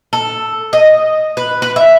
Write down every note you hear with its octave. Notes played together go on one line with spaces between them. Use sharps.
A4
D#5
B4
B4
E5